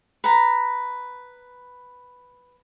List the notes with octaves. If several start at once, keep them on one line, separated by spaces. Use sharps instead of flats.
B4 A#5